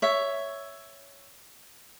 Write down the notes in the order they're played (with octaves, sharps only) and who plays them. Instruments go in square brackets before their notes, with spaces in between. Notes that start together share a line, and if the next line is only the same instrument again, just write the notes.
[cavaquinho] C#5 E5